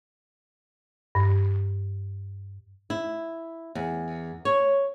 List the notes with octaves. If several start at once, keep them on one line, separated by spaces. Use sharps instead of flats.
G2
E4
E2
C#5